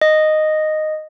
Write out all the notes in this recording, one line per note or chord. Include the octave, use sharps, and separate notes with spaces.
D#5